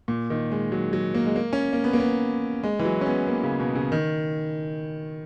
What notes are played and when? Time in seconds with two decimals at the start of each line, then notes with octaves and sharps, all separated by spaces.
0.08 A#2
0.30 D#3
0.52 G#3
0.72 F#3
0.93 F#3
1.14 A#3
1.26 G#3
1.36 A#3
1.53 C#4
1.73 A#3
1.84 B3
1.93 A#3
2.00 B3
2.63 G#3
2.79 E3
2.85 F#3
3.01 C#4
3.06 B3
3.27 A#3
3.43 C#3
3.60 B2
3.75 C#3
3.92 D#3